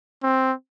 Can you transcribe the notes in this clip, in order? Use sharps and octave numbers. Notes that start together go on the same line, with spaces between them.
C4